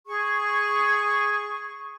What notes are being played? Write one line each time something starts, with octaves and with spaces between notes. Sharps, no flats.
G#4 C#6